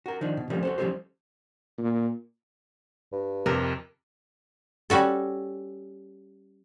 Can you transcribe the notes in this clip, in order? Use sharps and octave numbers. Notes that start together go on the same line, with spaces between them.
F#4 A#4
D#3 F3 D4
B2
F3 G3 A3 A#3 C4 C#4
F#4 A4 C5
F3 G3 C#4 G4 A4 C5
A#2
G2
F2 C3 A#4
G3 C#4 F#4 A4